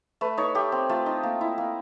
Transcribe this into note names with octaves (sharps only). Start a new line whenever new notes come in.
A3 B4
D#4 C#5
A3 G4
C4
A3 F4
D#4
A#3
E4
A#3